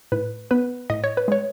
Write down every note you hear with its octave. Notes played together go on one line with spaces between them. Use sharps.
A2 B4
B3 B4
A2 D#5
C#5
B4
G#3 C#5